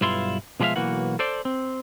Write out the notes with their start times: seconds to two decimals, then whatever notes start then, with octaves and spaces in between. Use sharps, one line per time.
0.01 B1 G2 E4 F4 C6
0.60 B2 F3 G#3 D5 E5 F5
0.76 B1 E3 A#3 F#4 F#5
1.19 A4 C5 D5
1.45 C4